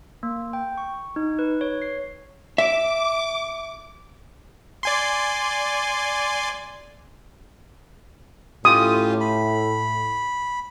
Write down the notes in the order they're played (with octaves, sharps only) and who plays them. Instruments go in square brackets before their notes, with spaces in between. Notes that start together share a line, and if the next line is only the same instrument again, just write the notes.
[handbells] A#3
G5
C#6
D#4
B4
C#5
C7
[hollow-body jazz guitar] E5 [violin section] D6
[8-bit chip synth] D5 G#5 C6
[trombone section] A2 [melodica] C#4 F4 G4 [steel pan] D#6
[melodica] B5